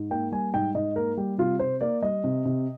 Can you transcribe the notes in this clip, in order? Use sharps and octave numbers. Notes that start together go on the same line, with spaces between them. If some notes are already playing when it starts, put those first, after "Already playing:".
Already playing: G#2
A#3 G5
G3 G#5
G#2 G5
G#2 D#5
A#3 A#4
G3 G4
C3 F4
C3 C5
A#3 D5
G3 D#5
C3
C3